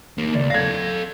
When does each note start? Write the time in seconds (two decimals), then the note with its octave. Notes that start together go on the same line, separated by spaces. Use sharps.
0.18 D#2 A#3
0.35 C#2 D5
0.50 A4 F5 G#6 A#6